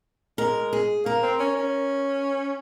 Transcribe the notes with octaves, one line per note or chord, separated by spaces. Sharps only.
G#3 A#4
G#4
A#3 A#4
C4
C#4
C#4